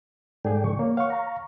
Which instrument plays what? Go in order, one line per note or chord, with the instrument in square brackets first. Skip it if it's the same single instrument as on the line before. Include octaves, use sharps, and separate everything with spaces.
[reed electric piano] G#2 G#4 [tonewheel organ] A4 D5 G5
[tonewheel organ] C#3 F3 C#6
[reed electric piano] A#3 [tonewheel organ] C#5
[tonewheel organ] C#5 F#5 [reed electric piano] F5 C#6
[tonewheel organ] A#5